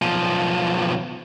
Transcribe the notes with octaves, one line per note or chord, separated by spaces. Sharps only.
B1 F3